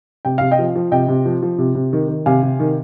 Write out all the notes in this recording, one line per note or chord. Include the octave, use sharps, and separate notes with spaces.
C3 G5
C3 F5
D#5 G5
F3
F3
C3 D#5 G5
C3
F3
F3
C3
C3
D#3
D#3
C3 F5 G#5
C3
D#3